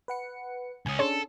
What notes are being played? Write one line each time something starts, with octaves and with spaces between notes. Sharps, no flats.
B4 F#5 C#7
C#2 C#4 G#5 D#6
C#4 D4 G#4 A4 C#5 G#5 C6